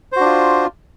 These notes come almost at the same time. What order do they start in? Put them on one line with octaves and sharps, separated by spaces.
C5 F#4 D4 F4